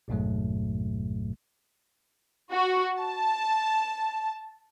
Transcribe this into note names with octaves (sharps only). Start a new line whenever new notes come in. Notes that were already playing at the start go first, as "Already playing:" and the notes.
A1 F2 G#2 B2 F#3 A3
F#4
A5